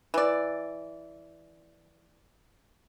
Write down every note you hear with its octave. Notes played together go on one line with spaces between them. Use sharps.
E3 D5